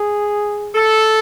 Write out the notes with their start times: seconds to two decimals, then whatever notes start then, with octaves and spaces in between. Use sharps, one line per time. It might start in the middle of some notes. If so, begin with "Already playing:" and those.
Already playing: G#4
0.75 A4